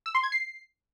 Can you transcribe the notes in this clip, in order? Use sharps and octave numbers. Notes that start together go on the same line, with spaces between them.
E6
C6
G#6
C7